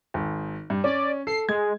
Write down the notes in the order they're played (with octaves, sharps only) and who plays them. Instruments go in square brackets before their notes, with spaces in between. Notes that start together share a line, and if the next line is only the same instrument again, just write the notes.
[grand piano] G#1
G2
[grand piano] C#4 [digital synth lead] D5
[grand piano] A4 [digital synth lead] C7
[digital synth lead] G#3 [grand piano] G#6